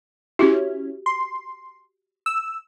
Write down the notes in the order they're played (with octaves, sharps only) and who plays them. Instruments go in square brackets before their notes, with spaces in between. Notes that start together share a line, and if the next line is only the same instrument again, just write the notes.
[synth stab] C#4 E4 [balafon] F#4 G4
[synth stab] C6
E6